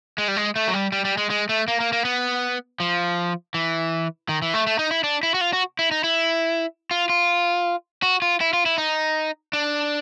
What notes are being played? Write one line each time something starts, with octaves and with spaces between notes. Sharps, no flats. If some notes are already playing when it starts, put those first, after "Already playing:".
G#3
G3
G#3
A3
F#3
G3
G3
G3
G#3
G#3
A3
A#3
A#3
A#3
B3
F3
E3
D#3
E3
A3
A3
D#4
E4
D4
E4
F#4
F4
F#4
E4
D#4
E4
F4
F4
F#4
F4
E4
F4
E4
D#4
D4